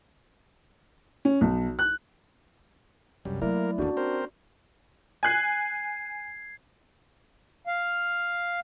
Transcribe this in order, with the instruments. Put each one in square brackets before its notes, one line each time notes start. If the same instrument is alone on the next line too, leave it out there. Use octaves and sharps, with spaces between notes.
[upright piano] C#4
B1
F#6
[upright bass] C2 [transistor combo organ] F#2 G3
[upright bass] F#3 [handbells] A3 E4 D5 [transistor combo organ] A#3 A#4
[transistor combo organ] D#2 D3 [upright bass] A#3 C#4 [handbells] D4 F#4 D5
[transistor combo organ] C4 A#4 C5
[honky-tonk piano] G#5 F#6 [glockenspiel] G#6 C7
[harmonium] F5